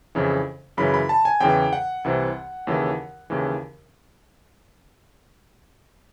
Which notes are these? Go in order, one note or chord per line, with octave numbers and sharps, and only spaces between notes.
F2 C#3 E3
F#2 C#3 E3 B5
B5
A5
G#5
E2 C#3 E3 G5
F#5
C2 C3 E3
D#2 C#3 E3
D#2 C#3 E3